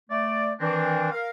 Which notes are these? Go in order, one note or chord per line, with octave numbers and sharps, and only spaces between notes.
A3 D5
D#3 E3 C4 D4
A#4 F5